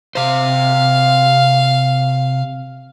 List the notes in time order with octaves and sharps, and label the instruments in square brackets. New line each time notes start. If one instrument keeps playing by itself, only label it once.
[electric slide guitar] C3 C5 [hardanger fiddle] F5